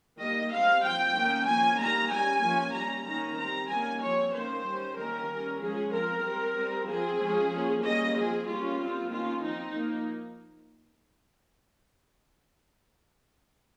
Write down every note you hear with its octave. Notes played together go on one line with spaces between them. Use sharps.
D#3 G3 A#3 D#5
G3 C4 F5
F3 C4 G5
D#3 A#3 C#4
F3 A#3 C#4 G#5
D#3 G3 A#3 A#5
G3 C#4 G#5
F3 A#3 C#4
G3 C#4 A#5
D#3 A#3 C#4 A#5
G3 C4 A#5
D#3 G3 A#3 C#4 G#5
F3 C4 C#5
D#3 A#3 C#4 C5
G3 C#4
D#3 G3 A#3 C#4 A#4
G3 C#4
F3 G#3 C#4 G#4
F3 C4 A#4
G3 C4
G3 C4
F3 C4 G#4
F3 G#3 C#4
F3 A#3 C#4
G3 A#3 C#4 D#5
F3 C4 G#4
G3 A#3 C#4 F4
G3 C4
D#3 A#3 C#4 F4
F3 C4 D#4
F3 A#3